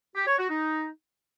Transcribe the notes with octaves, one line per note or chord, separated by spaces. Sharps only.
G4
C#5
F#4
D#4